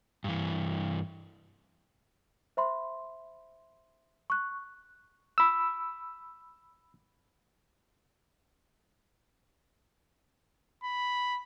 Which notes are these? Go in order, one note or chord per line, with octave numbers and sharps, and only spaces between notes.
G2 E3
C5 E5 B5 C6
C#6 F#6
B5 E6
B5